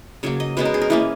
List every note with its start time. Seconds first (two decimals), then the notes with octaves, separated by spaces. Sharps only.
0.23 C#3 F#3 A#3 C#5
0.40 D#5
0.57 B2 G#3 C#4 B4
0.65 A#4
0.74 G#4
0.82 A#4
0.90 E3 A#3 C#4 B4